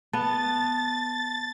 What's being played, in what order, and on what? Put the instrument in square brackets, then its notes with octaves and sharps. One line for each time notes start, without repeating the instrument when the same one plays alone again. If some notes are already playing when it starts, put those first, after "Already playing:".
[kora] B3 [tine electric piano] A5 [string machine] A6